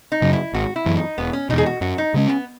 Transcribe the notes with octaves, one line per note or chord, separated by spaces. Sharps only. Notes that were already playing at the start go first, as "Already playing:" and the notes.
D#4
F#2 C#3 F#3
E4
G#1 F#4
E4
F#2 E3
D#4
E1 B3
C#4
E2 B2 D#4
G#4
F#4
F#2 F#4
D#4
C#3 G#3 C#4
B3